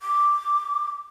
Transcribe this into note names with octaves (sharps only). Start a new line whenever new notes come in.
D6